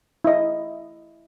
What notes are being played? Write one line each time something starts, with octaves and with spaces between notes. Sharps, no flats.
E4 D#5